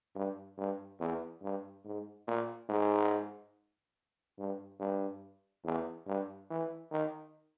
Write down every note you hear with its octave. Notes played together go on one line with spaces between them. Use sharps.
G2
G2
E2
G2
G#2
A#2
G#2
G2
G2
E2
G2
E3
D#3